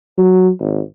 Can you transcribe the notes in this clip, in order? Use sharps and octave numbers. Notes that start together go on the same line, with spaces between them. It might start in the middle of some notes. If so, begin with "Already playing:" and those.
F#3
G#1